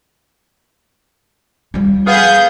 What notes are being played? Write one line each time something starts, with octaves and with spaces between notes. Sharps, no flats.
F3 G3
B3 G#4 F5 G6